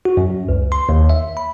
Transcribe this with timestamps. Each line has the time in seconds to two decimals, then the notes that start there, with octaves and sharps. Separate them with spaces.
0.05 F#4
0.17 F#2
0.49 C#2
0.72 C6
0.89 D#2
1.09 E5
1.37 B5